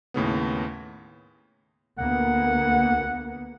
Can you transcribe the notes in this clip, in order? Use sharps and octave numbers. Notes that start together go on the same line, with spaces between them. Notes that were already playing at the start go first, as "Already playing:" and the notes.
D#2 A2 C#3 B3
D2 A#3 B3 F#5